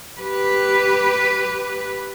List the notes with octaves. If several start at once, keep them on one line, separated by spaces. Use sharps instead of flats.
G4 B4